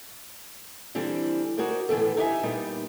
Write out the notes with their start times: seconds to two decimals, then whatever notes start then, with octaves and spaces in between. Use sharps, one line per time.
0.95 D3 E3 G3 C4 D4
1.57 D#4 F#4 G#4 A#4 C5 D5
1.89 A2 D3 E3 B3 A4
2.17 D#4 G4 D#5 E5 G#5
2.43 A#2 G3 B3 D#4